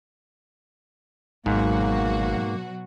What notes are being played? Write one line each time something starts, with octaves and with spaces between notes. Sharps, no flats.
G#1 G#2 B2 F#3 A#3 F#4